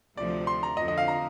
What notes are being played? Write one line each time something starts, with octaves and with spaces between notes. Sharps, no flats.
D2 C3 F3 D5
C6
A#5
F2 D3 F3 D#5
D#5
F5
A#5